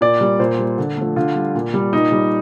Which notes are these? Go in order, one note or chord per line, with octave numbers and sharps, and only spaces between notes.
A#2 D5
G3
A#2 C5
G3
D3
F3 A3
D3 F4
G3
A#2
G3
A#2 D#4
G3